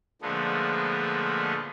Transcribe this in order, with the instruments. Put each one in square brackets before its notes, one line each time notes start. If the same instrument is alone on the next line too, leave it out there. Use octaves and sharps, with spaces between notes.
[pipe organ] A#2 D3 F3 G#3 A3 B3